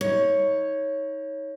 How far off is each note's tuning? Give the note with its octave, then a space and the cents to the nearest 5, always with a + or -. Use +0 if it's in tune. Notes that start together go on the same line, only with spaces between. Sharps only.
D#4 +35 C#5 +0